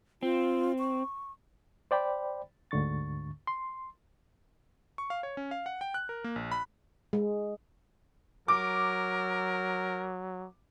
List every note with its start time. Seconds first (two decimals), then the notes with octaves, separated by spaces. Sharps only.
0.23 C4 F4
0.79 C#6
1.91 C5 D5 G5 B5
2.71 D2 G#2 D3 C#6 A6
3.47 C6
4.98 C#6
5.10 F5
5.23 C#5
5.37 C#4
5.51 F5
5.66 F#5
5.81 G5
5.94 F#6
6.09 A#4
6.24 A#3
6.36 A#1
6.52 B5
7.13 G#3
8.48 F#3 A#4 D6